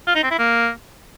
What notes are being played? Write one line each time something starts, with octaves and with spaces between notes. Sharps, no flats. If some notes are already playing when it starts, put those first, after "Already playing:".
F4
D#4
C4
E4
A#3